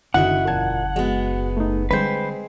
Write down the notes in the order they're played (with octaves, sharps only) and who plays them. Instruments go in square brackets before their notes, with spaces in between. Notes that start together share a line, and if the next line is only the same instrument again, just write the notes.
[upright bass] F#1 [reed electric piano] D3 D#3 [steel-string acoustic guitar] E4 F#4 D#5 [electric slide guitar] F#5
[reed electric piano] E2 A5 G#6 [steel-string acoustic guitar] A#2
[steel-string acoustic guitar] G#3 B3 [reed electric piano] F#4
[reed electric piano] A3 D#4
[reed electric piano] D3 [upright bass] G3 [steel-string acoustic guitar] G#3 C4 [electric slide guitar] B4 C5